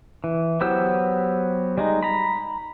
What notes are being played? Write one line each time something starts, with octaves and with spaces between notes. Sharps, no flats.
E3
F#3 B3 G4 C5 E6
G3 G#3 D#4
A#5 B5